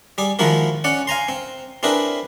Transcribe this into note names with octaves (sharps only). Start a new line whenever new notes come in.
G3 G#4 D6
D#3 F3 G#3 E4 F#4 A#4
C#4 D5 F#5
F5 G#5 A#5 C6
C4
C4 D4 E4 G#4 A#4 B4